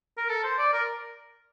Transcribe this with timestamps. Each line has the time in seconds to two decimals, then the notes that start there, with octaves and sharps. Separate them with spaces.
0.17 A#4
0.29 A4
0.44 C5
0.58 D5
0.73 A#4